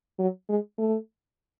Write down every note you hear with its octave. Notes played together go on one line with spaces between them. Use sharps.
F#3
G#3
A3